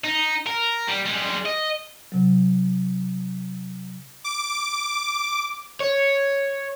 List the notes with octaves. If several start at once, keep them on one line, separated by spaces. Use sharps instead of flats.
D#4
A#4
G3
G3 G#3
D#5
C3 F#3
D6
C#5